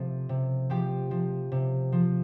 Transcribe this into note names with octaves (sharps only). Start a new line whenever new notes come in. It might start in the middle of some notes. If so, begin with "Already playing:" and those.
Already playing: C3 F3 A3
C3
F3 G4
F3
C3
F3